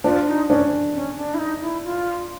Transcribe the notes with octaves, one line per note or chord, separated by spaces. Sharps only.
D4 F4
D#4
C#4 D4
C#4
D4
E4
D#4
E4
F4